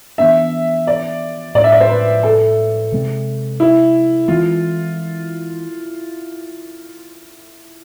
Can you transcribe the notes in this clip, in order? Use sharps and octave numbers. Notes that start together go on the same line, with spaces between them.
E3 B3 D4 E5
D5
A2 G#3 D4 D5
E5
D5
C5
B4
A4
C3 G#3 C4
E4
E3 G#3 C4 F4